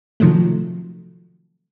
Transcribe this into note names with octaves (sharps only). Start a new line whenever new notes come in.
C3 D#3 F3 F#3 A3